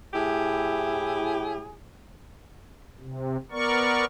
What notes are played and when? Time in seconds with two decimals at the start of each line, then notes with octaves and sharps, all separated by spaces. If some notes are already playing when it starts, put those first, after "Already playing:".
0.13 A2 E4 G4 G#4
3.01 C3
3.52 B3 A#4 D5 C#6